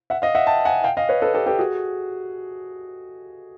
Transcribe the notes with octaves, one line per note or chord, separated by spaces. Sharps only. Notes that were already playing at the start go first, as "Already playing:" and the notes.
E5 F#5
D#5 F5
E5 F#5
G5 A5
F#5 G#5
F5 G5
D#5 F5
B4 C#5
A4 B4
G4 A4
G4 A4
F#4 G#4